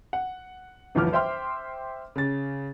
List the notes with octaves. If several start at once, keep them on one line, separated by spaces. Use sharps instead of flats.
F#5
G1 D2 E3 F3 D6 F6
C5 E5 G5 C6 F6
C#3 A6